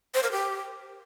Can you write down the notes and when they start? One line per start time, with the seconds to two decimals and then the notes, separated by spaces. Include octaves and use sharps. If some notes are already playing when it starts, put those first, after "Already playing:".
0.14 C5
0.23 A#4
0.32 G4